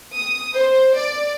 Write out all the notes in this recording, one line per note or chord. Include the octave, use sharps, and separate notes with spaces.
D#6
C5
D5